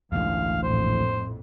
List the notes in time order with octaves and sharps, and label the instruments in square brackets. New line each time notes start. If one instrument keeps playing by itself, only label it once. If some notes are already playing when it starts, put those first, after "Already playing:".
[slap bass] A1 D2 [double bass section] G2 G#3 [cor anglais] F5
[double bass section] A#1 F2 A2 [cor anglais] C5